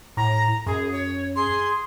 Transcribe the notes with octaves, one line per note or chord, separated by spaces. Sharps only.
A2 A#5
F#2 G#4
C#5
G#4 C6